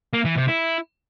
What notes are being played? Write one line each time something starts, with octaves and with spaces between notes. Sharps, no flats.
A#3
E3
C3
E4